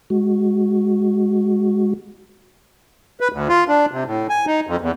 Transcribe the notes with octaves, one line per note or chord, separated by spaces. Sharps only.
G#3 F#4
B4
D2
F4
D4
C3
A2
G#5
D#4
F2
E2